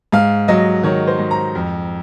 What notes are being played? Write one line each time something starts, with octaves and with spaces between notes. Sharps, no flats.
G#2 F5
F#3 D#5
D#3 C#5
C5
G#2
A#5
F2